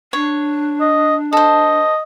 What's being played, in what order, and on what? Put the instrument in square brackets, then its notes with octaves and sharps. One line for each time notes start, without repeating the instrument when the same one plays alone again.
[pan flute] D4 [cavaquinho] C#5
[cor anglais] D#5
[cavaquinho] A4 C5 [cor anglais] D#5